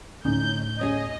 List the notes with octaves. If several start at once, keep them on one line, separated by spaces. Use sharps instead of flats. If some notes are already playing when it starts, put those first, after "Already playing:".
D2 A2 D3 C#4 D#4 G6
C#4 G#4 D#5 G#6